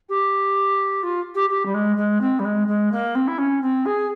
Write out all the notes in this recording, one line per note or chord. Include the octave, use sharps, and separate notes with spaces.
G4
F4
G4
G4
G3
G#3
G#3
C4
G3
G#3
G#3
A#3
C4
E4
C#4
C4
G#4